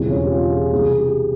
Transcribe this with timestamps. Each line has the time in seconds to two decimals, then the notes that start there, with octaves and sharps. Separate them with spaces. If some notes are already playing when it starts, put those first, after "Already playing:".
Already playing: E1 E2 C#3 E3 G3 C4
0.11 C#4
0.27 G4
0.30 F4
0.52 G#4
0.73 C2 C3 E3 G#4
1.00 G4